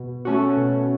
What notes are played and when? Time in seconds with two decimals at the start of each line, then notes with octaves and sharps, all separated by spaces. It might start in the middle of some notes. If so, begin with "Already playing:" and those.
Already playing: B2
0.25 A3 C#4 F#4
0.57 B2